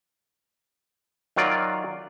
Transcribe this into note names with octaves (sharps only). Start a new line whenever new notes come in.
D#3 F#3 F4 D5